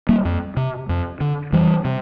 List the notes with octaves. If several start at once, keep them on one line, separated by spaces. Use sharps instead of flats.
G3 A#3
F2
C3
F2
D3
F2 E3 G3
C3